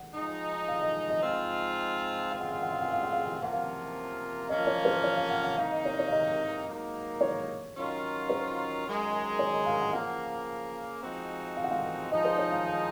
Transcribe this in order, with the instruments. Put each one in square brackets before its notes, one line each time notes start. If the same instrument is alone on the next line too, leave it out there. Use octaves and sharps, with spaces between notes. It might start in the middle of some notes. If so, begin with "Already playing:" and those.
Already playing: [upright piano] F#5
[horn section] F3 G#3 D#4
[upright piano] F5
D#5
D#5
[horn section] G#2 F3 C4 F4
[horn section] C#3 G#3 C4 F4 [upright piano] F5
[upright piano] F#5
F5
F#5
F5
F#5
F5
F#5
F5
F#5
F5
[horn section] C3 F3 A#3 C#4 F4 [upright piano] F#5
[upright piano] F5
[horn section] F3 A#3 C#4 [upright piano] D#5
[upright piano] C#5
C5
C#5
F5
F#5
F5
[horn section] C3 D#3 A#3 D#4 [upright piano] F5
[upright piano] D#5
C#5
C#5
F5
D#5
[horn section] G#2 F#3 A#3 D#4
[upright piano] C#5
[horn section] D#3 F#3 C#4 F4
[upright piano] C5
[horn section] F#2 D#3 G#3
[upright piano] C#5
D#5
F5
F#5
[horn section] C#3 F3 A#3 [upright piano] F#5
[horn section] F3 G#3 C4 D#4 F#4
[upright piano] F5
F#5
F5
[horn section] F3 G#3 D#4 [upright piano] D#5
[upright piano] C5
C#5
F5
F5